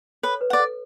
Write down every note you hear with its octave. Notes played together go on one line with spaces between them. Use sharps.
A4 B4 C#5
B4
D5 F#5
A4